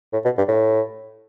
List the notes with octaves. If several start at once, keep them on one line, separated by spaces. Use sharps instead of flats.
A2
B2
G2
A2